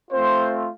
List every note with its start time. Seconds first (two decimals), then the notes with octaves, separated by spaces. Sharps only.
0.11 A3 C4 F4 C5